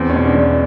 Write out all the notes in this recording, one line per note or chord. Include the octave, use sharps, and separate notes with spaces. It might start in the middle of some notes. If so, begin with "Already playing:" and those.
Already playing: E2 C4
B2 C#4
D4
E2